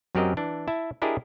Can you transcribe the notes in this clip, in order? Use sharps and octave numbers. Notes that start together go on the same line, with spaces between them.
F#2 F#3 C4 G4 A#4 D#5
E3 D4
E4 E5 A5
D4 E4 G4 G#4 A#4 D#5